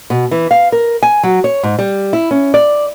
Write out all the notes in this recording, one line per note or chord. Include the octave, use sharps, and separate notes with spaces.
B2
E3
F5
A#4
G#5
F#3
C#5
G#2
G3
E4
C#4
D5